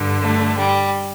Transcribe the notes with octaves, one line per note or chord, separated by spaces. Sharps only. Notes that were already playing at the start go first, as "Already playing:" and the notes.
Already playing: G2 D3
A3
G3